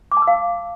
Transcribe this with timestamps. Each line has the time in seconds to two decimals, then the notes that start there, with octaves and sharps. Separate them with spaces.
0.12 D6
0.17 A5
0.22 E6
0.27 F5